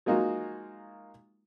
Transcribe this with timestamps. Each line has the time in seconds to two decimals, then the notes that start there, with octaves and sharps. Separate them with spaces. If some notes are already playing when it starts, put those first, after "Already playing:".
0.06 F#3 G#3 A#3 D#4 F4 F#4